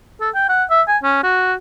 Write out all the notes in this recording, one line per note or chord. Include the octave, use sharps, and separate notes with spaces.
A4
G5
F#5
E5
G#5
C#4
F#4